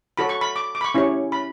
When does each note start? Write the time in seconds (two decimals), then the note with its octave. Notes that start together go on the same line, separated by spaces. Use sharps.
0.17 F#4 A4 C#5 B5
0.29 C#6
0.41 B5
0.56 D6
0.75 D6
0.81 B5
0.84 C#6
0.94 C#4 E4 G4 C#5
1.32 B5